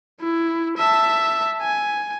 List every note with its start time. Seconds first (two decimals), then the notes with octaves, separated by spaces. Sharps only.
0.21 E4
0.77 E5 A5
1.62 G#5